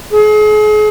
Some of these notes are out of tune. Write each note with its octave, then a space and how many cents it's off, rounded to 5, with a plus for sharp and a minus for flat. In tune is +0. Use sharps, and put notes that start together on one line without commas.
G#4 +40